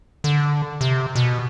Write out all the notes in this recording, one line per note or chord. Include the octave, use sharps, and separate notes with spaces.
D3
C3
B2